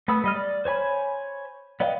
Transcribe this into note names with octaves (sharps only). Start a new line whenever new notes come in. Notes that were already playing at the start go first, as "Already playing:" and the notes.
A3 B3 B5 D#6 E6
G3 D#5 F6
D5
C5 C#5 G#5 B5
B3 D5 D#5 F5 G5